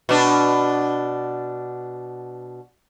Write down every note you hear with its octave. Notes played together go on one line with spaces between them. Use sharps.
B2 D4